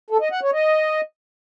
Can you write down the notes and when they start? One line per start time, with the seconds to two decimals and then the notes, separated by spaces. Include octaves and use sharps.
0.10 A4
0.21 D#5
0.32 F#5
0.42 C#5
0.53 D#5